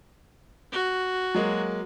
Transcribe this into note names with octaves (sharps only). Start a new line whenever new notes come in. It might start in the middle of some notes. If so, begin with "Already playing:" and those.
F#4
F#3 G#3 A#3